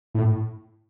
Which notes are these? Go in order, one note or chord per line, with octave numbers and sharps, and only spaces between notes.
A2